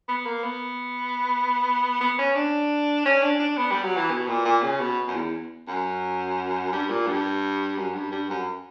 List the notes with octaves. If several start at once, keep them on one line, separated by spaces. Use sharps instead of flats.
B3
A#3
B3
B3
C#4
D4
C#4
D4
D4
B3
G3
F#3
E3
B2
A#2
A#2
C#3
B2
F#2
E2
F#2
G2
A#2
G2
F#2
G2
G2
F#2